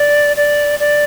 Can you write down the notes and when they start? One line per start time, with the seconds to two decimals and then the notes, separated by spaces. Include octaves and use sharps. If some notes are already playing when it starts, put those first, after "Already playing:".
Already playing: D5
0.37 D5
0.79 D5